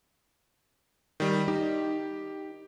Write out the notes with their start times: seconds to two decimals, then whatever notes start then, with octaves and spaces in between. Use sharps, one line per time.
1.20 D#3 G3
1.48 D#4 G4